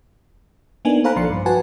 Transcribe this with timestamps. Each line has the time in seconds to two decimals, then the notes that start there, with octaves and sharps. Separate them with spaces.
0.85 A#3 B3 D4 D#4 G#5
1.04 A4 C5 F5 A#5 B5 F#6
1.16 A#1 F3 C6 C#7
1.30 G2
1.46 F#4 B4 F#5 G#5 A5